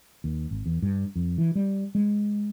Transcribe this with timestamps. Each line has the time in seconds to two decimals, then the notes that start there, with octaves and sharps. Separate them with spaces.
0.24 D#2
0.51 G#1
0.66 E2
0.82 G2
1.16 F2
1.38 E3
1.55 G3
1.95 G#3